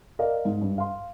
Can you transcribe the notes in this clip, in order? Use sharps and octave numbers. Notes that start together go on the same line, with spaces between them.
A#4 D5 D#5 F5
G#2
G2
F5 C6